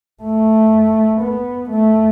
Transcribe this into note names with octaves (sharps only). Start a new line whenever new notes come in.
A3
B3
A3